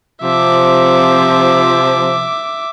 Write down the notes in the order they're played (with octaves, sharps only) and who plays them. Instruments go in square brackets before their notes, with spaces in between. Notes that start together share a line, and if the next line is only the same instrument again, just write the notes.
[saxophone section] C3 F3 [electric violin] E5 D6